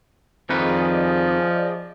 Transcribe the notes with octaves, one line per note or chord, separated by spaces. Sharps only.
F2 D#3 F3 G#4 B4 D5 D#5